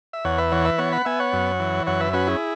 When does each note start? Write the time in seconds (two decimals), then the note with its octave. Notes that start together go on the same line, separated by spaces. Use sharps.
0.13 E5
0.25 E2 C#5 F#5
0.38 B4 E5
0.51 E3 C#5 F#5
0.65 B4 E5
0.78 B3 C#5 F#5
0.92 F#5 B5
1.05 B3 E5 G#5
1.20 C#5 F#5
1.33 F#2
1.60 E3
1.87 F#2 C#5 F#5
2.00 B4 E5
2.13 C#4 F#4 B4
2.27 E4 G#4